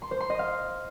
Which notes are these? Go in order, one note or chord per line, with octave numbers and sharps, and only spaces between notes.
C6
C5
C6
D#5
F5